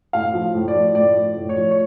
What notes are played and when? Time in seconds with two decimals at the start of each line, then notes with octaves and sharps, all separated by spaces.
0.13 A2 F5
0.34 F3
0.55 A2
0.68 D5
0.75 F3
0.95 A2 D5
1.16 F3
1.36 A2
1.49 C#5
1.57 F3
1.71 C#5